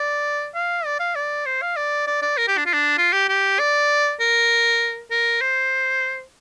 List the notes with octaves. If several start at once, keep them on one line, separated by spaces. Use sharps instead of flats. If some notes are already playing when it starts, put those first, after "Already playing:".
Already playing: D5
F5
D5
F5
D5
C5
F5
D5
D5
D5
A#4
G4
D4
F4
D4
F4
G4
G4
D5
A#4
A#4
C5